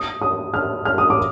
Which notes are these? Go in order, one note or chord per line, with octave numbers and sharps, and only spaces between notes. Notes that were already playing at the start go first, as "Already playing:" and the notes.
Already playing: D#6
D#6
F6
F6
D#6
D6